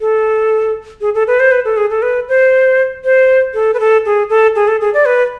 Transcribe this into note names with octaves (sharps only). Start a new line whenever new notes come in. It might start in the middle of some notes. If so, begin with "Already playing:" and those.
A4
G#4
A4
B4
C5
B4
A4
G#4
A4
B4
C5
C5
A4
B4
A4
G#4
A4
G#4
A4
G#4
D5
B4